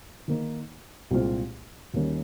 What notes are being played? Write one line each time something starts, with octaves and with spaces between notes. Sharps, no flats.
D#3 A#3 D#4
C2 A#2 G#3 C4 F4
D#2 D#3 G3 A#3 C#4